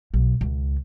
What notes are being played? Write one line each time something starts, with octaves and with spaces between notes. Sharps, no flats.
B1
C#2